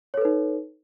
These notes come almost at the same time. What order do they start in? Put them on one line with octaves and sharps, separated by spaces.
C#5 A4 B4 D#4